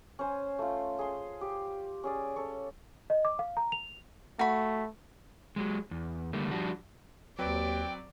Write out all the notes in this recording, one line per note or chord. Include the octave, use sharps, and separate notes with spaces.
C#4 C5 G#5
A3 F4
G#4 C6
G4
C#4 G#4 D5
A4 C#5
D#5
D6
F5
A#5
F7
A3 F#4 B5
F#3 G#3
E2
D3 G3 A3 A#3
F3 G3 D4 F#4
D#2 F#3 C4 B4 D5 G5